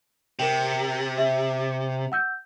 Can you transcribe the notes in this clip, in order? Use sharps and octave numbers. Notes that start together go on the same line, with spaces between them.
C3 A#4 G5
E5
F#5 E6 G6